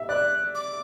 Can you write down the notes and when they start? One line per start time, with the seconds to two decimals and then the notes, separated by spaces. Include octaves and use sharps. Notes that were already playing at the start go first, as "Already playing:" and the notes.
Already playing: E5
0.09 D5 F#6
0.55 D6